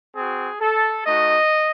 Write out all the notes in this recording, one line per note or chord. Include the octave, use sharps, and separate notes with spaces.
C4 F#4 G#4
A4
A3 D#4 F#4 D#5